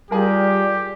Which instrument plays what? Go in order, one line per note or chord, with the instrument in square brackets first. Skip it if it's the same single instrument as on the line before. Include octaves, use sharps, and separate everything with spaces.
[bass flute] G3 [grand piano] F4 G#4 A#4 [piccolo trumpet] G4